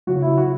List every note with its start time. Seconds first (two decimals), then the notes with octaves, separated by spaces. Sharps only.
0.07 C#3 F#3 F#4
0.22 E4
0.37 F#4